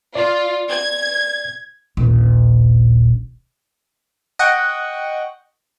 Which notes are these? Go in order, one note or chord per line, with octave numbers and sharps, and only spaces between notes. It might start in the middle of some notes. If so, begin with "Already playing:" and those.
F4 D5
G#6
D#1 A#1
D#5 F#5 G5 C#6